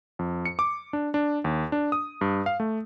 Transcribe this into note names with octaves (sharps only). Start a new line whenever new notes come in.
F2
C#7
D6
D4
D4
D#2
D4
D#6
G2
F5
A3